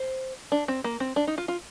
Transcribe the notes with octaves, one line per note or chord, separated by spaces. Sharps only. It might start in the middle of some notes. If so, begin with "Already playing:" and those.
Already playing: C5
D4
C4
A#3
C4
D4
D#4
F4
F4